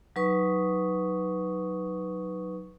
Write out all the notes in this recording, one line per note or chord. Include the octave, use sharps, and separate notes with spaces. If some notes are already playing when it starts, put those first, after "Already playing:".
F#3 D#4 B4 C#6 D#6